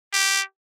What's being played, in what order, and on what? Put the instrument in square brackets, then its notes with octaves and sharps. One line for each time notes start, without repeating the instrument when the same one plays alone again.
[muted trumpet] G4